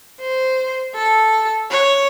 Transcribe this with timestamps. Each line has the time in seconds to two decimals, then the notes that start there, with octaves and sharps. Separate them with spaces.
0.20 C5
0.95 A4
1.70 C#5